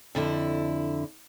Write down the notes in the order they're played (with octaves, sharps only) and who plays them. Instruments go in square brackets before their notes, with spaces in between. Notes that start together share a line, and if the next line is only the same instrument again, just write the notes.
[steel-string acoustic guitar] F2 D3 E4